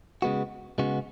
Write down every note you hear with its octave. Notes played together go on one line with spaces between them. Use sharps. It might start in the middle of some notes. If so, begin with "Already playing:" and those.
C#3 G#3 B3 F#4
C#3 G#3 B3 F#4